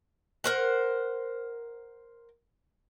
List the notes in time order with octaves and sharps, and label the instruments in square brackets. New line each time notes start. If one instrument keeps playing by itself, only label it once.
[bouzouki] A#4 C5 F#5